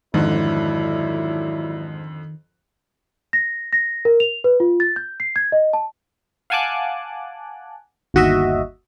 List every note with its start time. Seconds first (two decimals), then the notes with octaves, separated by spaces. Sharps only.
0.14 F2 G#2 D3 D#3 F#3 D4 E4
3.33 A#6
3.73 A#6
4.05 A#4
4.20 F7
4.44 B4
4.60 F4
4.80 A6
4.96 G6
5.20 C7
5.36 G#6
5.52 D#5
5.73 A5
6.50 F5 F#5 G#5 A5 D6 F#6
8.14 G1 D#2 F#4 D#5 E5